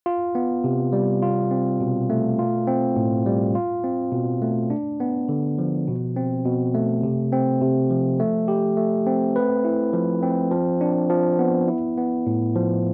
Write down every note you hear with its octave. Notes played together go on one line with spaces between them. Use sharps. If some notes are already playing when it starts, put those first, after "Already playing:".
F4
B3
C3
G3
F4
C4
B2
A3
F4
C4
A2
G3
F4
C4
B2
A3
D4
B3
D3
F3
B2
C4
B2
A3
C3
C4
C3
F3
A3
G4
A3
C4
B4
E4
F3
C4
F3
D4
F3
B3
E4
B3
A2
F3